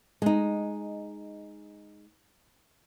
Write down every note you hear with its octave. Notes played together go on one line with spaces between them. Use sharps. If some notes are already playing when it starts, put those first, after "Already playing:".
G#3 D#4